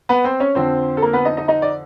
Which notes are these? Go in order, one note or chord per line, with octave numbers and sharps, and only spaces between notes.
B3 B4
C4 C5
C#4 C#5
F2 D3 F3 C4 C5
A4
A#3 A#4
B3 B4
D#4 D#5
D#4 D#5
D#4 D#5
D5